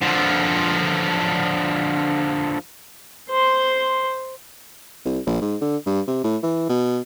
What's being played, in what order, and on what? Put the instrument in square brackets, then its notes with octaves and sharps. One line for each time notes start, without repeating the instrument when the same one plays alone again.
[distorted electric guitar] D3 F3
[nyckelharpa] C5 C6
[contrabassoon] C2
A#1
G#2
D3
G2
C3
A2
E3
B2